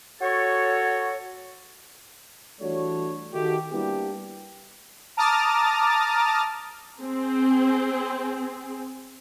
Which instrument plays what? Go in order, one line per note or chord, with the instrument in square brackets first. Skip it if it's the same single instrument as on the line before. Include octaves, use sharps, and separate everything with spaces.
[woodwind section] F#4 A4 C#5
[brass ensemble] E3 G3 A3 D4 F#4 C#5
D#3 A3 F#4 G4
G3 A#3 B3 D4 E4 G4
[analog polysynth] A5 A#5 D6 D#6 F6 A6
[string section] C4 G#4